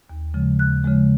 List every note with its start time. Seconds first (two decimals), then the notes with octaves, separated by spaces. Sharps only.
0.10 D#2
0.34 C#3 F3 G#3
0.59 D#2 F#6
0.84 C#3 F3 G#3